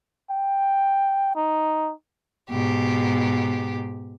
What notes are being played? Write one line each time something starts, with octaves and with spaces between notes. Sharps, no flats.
G5
D#4
G#2 B2 G4